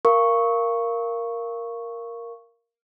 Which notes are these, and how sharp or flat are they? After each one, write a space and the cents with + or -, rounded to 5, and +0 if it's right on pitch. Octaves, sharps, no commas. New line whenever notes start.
A#4 +0 F5 -20 C#6 +0